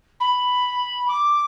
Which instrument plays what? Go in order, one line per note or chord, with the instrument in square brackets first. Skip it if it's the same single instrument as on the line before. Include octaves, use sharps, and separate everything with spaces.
[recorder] B5
D6